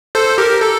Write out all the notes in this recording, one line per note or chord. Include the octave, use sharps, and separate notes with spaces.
A4 C5
G4 A#4
A4